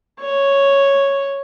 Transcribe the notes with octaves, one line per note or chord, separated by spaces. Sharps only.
C#5